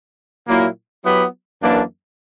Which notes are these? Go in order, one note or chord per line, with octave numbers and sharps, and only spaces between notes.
A#2 F#3 A#3 E4
F#3 B3 E4 G4 B4
F#2 E3 A#3 D4